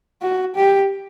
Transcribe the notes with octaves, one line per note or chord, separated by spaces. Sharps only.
F#4
G4